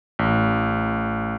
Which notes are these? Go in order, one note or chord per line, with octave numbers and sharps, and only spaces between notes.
A1